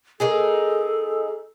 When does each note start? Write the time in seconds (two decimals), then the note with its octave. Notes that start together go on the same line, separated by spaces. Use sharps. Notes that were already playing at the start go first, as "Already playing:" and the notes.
0.20 A#3 D#4 G#4 A4